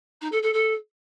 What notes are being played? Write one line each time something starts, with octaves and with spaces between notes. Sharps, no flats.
D#4
A4
A4
A4